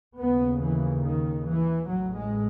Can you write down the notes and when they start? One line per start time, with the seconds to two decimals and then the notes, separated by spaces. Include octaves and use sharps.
0.17 D#2 C#3 B3
0.58 E3
1.02 D#3
1.43 E3
1.85 A1 A2 F#3
2.14 G#3